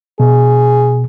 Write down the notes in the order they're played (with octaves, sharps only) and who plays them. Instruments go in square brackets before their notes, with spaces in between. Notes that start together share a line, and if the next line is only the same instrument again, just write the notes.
[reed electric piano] B2 [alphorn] G#4